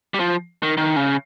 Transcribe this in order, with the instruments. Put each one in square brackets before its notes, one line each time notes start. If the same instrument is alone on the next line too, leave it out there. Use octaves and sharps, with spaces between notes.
[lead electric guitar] G3
F3
D#3
D#3
C#3